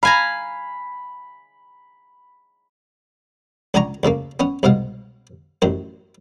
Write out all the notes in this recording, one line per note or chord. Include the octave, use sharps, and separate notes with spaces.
F5 G#5 A#5 B5
C#2 D4 F#5 G#5 A#5 C#6
D2 C#3 A3 A#3
B3 C#4 F#5
C2 G#2 B2 F5 F#5
A1 F#2 C5